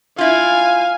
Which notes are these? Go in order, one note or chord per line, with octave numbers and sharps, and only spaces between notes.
E4 F4 F5 G#5